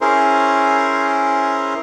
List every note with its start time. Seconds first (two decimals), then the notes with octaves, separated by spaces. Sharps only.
0.01 C#4 E4 G#4 A#4 C5